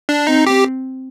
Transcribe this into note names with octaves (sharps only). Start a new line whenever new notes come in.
D4
C4 D#4
G4